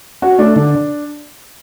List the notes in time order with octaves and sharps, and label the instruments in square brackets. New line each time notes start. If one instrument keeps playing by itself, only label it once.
[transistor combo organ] C#4 [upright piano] F#4
[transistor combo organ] A3 [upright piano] D4
[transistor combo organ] D3 [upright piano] D4